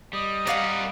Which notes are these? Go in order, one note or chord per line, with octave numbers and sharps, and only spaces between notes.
G3 D#5
A#4 D5 F5 F#5 B5